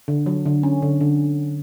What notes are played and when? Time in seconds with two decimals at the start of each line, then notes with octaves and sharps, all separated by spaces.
0.08 D3
0.26 F#3
0.46 D3
0.63 C#4
0.82 D3
1.01 D3